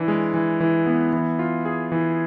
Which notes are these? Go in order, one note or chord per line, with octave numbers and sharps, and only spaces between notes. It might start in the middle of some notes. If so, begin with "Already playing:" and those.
Already playing: E3 D4
G#3
E3
E3
B3
E3
F4
G#4
E3